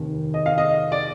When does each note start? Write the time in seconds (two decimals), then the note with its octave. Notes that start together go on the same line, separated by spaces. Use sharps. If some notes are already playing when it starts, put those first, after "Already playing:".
Already playing: F1 D#2 D#3
0.34 D#5
0.46 F5
0.58 D#5
0.92 D5